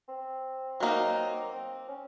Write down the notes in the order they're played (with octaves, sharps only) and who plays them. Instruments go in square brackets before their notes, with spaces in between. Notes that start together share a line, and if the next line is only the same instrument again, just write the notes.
[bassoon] C4
[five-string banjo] F#3 A#3 D#4
[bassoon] C4
C#4